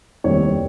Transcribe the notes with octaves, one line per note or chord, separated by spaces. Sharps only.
F1 D#2 D#3 G3 C4 C#5